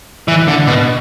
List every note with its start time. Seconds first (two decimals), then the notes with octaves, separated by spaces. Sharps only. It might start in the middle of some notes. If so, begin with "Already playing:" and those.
0.28 E3
0.48 D3
0.67 B2